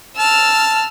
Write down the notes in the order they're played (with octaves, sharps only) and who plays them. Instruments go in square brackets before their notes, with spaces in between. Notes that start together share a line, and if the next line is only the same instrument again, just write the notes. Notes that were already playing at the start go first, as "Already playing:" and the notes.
[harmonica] A5 [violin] E6 F6